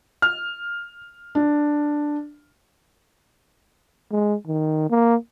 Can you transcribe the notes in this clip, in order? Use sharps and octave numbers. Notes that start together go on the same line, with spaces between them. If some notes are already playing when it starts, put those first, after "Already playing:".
F6
D4
G#3
D#3
A#3